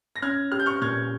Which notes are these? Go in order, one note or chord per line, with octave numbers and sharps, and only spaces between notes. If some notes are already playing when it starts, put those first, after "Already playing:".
A#6
C#4 F6 G#6
G4 F6
G6
C#6 F6
A#2 F6 G#6